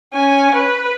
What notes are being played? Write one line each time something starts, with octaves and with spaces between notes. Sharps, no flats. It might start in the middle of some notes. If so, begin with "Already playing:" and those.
C#4 G#5
B4